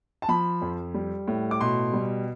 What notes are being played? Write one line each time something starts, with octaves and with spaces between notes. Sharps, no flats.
A5
F3 B5
F2
G3
A2
D6
B2 C6
G3